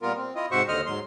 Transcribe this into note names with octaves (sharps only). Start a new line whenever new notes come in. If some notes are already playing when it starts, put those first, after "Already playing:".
A#2 G3 B3 F4 A#4
C4
E4 F4 D#5
G#2 C3 F#4 C5 E5 C#6
D#2 D3 C5 D#5 F6
G#2 F#3 C6